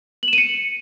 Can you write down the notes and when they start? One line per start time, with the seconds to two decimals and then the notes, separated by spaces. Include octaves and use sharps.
0.23 F#7
0.28 E7
0.33 D#7
0.38 C#7